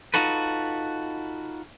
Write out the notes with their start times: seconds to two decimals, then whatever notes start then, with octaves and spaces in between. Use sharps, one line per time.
0.14 D#4 F4 F#4 A4 B4